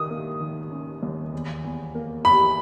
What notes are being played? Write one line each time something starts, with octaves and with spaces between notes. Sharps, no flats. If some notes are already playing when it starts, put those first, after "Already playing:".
Already playing: D#3 D#6
A#3
D#3
C#4
D#2
E2
E2
A#3
E2 B5